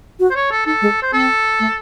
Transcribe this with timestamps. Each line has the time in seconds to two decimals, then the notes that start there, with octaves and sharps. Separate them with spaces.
0.20 F#4
0.31 C5
0.35 C#5
0.51 A4
0.66 D#4 A4
0.82 G#3
1.02 C5
1.13 C4 A4
1.60 A3